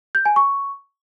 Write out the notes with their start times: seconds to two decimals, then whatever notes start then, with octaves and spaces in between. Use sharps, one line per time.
0.15 G6
0.26 G#5
0.36 C#6